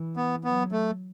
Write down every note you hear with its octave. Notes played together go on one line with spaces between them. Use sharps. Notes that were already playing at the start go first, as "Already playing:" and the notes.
Already playing: E3
B3
F#3 B3
A3